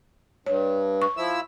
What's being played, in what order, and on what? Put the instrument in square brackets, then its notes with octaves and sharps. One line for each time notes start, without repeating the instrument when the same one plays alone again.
[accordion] G2 [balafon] C#5
[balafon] C#6
[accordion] F3 E4 E6